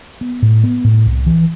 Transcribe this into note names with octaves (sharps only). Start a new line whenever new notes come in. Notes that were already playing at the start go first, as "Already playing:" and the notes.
B3
A2
B3
A2
C2
E3